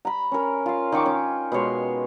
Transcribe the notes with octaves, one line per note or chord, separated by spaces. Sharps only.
A#5 B5
C#4 A#4
F4 F5
D#3 G5 C#6 D6
C#4
B2 G#3 C#5 C6